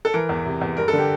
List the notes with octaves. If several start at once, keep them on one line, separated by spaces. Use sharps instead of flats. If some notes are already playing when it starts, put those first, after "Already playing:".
A4
E3 A#4
E2
C3
E2
G2 A#4
A4
D3
G4